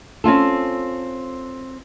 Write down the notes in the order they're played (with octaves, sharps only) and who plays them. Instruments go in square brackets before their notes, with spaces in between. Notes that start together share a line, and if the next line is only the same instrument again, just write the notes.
[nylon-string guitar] C4 C#4 F4 A4